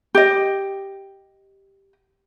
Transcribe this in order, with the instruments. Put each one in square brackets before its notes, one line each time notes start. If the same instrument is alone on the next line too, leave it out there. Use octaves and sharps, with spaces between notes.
[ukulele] G4 D#5